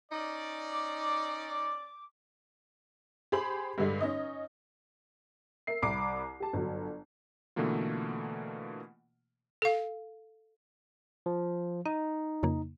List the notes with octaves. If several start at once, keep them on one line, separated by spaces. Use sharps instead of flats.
C#4 D#4 D5
D6
G4 G#4 C5 B5 F#7
G2 D3 G3 G#3
C#4 D#4 D#5
A#4 E5 C7
C2 B5 D6 C7
G4 A5
G1 F#3
B2 D3 E3 A3 A#3 F4
A4 F5
F3
D#4 D#5
F2 C#3 A#3